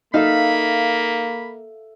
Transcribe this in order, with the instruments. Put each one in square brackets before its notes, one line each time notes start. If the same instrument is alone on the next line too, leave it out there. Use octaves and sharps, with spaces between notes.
[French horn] A#3 [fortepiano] D#4 [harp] A4 E5 F5 [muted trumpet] B5